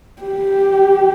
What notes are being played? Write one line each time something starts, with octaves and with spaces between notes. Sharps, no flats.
G4